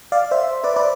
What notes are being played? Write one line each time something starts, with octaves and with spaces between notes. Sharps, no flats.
D5 F5
C5 E5
B4 D5
B4 D5